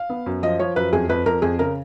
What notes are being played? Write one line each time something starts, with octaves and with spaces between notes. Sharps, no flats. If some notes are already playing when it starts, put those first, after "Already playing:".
Already playing: F5
B3
F#2
F3 D#5
F3 C#5
F#2 B4
F2 G#4
F2 B4
F2 A#4
F2 G#4
C#3 A#4